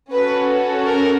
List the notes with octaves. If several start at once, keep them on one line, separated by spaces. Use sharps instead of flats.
C#4 F#4 A4 B4
A#4